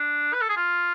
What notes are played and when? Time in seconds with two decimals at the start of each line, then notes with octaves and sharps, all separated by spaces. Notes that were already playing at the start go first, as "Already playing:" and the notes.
Already playing: D4
0.33 B4
0.41 A4
0.49 G#4
0.57 F4